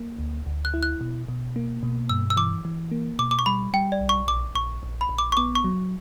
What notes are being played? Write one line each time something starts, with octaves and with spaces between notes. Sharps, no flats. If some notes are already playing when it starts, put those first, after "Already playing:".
Already playing: A#3
D2
D2
F#6
E4
F#6
B2
B2
A#3
B2
G2 E6
E6
E3 D6
E3
A#3
B2 D6
D6
C#6
G3 B5
G3 G5
D5
B1
C#6
A#1 D6
A#1 C#6
A#1
B5
A#1
D6
C#6
B3 D6
C#6
F#3